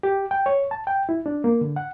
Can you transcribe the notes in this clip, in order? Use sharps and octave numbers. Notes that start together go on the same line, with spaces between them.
G4
G5
C#5
A5
G5
E4
D4
A#3
D3
F#5